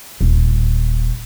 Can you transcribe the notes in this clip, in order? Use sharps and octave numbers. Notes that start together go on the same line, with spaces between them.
D#1